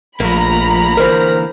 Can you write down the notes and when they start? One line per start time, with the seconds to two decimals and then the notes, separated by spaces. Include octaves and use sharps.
0.20 A#1 F3 A3 A#3 A#5 B5
0.97 D3 E3 A#3 A#4 C5